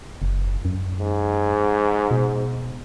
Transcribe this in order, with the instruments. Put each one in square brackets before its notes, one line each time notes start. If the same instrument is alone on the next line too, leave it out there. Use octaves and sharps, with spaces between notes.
[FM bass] F#1
F#2
[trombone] G#2
[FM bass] B2